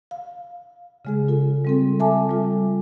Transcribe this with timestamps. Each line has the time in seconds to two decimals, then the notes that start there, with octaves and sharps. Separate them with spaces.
0.11 F5
1.05 C#3 G#3 G#4
1.28 F4 A4
1.65 G3 C4 A4
1.99 A4 E5 G#5 A5 D6
2.29 G3 F4